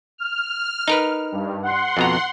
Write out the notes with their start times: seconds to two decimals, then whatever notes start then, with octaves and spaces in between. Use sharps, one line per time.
0.18 F6
0.88 D#4 A#4 B4
1.32 G2
1.63 F#5 C6
1.97 F2 B2 A#5